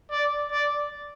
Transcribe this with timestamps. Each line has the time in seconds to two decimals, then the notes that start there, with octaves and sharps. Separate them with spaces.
0.11 D5
0.51 D5